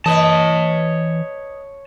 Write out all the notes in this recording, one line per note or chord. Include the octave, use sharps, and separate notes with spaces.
E3 B4 C#5 D#5 A5